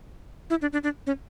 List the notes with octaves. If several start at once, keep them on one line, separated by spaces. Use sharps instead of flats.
E4
D4
D4
D4
C#4